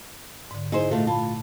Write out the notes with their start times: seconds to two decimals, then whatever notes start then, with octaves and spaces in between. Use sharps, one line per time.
0.51 G#2 D3
0.72 D#4 E4 G#4 C5
0.91 A#2 G#3 A3 F4
1.07 F4 A5 B5